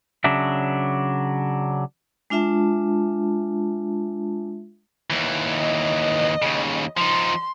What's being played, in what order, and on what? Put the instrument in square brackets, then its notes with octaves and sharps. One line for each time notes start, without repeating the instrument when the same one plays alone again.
[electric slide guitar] C#3 F#3 D4 E5
[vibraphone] G#3 D4 F4 E5 A5
[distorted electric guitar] D#2 E3
[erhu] D#5
[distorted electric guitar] D#2 C#3
[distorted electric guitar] F3 D#4 [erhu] C6